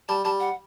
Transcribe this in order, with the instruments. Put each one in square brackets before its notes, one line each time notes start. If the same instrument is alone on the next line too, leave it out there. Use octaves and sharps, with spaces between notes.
[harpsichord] G3 [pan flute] A5
[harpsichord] G3 [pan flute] A5
[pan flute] F#5